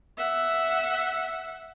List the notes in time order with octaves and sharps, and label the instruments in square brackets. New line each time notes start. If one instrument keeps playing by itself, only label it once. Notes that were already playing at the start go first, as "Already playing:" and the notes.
[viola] E5 F#5